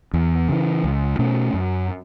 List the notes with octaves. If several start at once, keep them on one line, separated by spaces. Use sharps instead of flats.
E2
C#3 E3
C#2
B2 A3 C#4
F#2